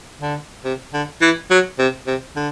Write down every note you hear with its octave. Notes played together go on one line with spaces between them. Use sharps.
D3
C3
D3
E3
F#3
C3
C3
D3